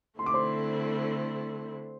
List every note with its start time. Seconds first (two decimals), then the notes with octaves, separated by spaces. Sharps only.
0.19 D3 A3 C4 E4 C6
0.26 D6
0.34 C5 C6